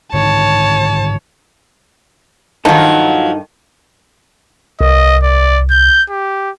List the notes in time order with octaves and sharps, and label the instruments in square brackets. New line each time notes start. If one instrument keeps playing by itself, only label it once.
[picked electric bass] G#2 D3 D#3 [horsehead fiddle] C#5 [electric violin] A5
[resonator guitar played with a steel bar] G2 D#3 [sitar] F3 F#3 [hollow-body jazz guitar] D#4 A4
[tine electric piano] C2 [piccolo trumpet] D#5
[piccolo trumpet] D5
G6
G4